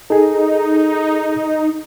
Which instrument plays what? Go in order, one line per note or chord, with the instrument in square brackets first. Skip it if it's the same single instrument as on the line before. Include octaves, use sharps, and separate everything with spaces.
[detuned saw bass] D#4 [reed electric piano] G#4 A4